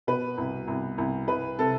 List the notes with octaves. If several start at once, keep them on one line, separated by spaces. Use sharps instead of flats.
B2 B4
C2
C2
C2
C2 B4
C3 A4